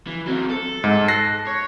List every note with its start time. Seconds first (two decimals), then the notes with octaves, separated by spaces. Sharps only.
0.07 E3
0.27 F#3 C4
0.50 A4
0.84 G#2
1.08 F#6 A#6 C7
1.47 C#5